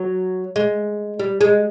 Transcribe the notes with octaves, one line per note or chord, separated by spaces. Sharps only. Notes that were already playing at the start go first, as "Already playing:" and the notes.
Already playing: F#3
G#3
G3
G#3